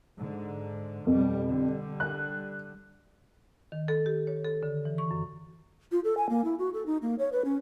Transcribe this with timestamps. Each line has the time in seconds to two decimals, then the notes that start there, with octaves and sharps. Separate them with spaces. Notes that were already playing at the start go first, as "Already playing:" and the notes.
0.17 G#2 D3
1.07 F2 B2 G3
1.48 D3 G3
2.00 F#6
3.72 D#3
3.88 A4
4.06 G4
4.27 C#5
4.44 A4
4.63 D3
4.85 E3
4.98 C#6
5.11 F#2
5.92 F4
6.04 A4
6.17 G#5
6.29 A#3
6.45 E4
6.59 F#4
6.74 A4
6.86 D#4
7.02 A#3
7.19 C#5
7.32 B4
7.45 C#4